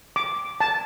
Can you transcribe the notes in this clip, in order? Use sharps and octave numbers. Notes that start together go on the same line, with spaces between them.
D6
A5